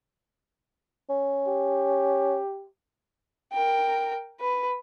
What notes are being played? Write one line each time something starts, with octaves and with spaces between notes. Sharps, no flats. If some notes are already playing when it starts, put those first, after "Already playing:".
C#4
G4
A#4 G5
B4